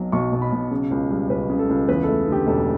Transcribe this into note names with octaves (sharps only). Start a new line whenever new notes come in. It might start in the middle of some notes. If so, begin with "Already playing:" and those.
Already playing: B1 B2 F#3
B1 C#6
B2
B5
B1
C#3
C#2
G3
C#2 B4
C#3
A4
C#2
E2 B4
A4
A3
D3 G4
E1 A4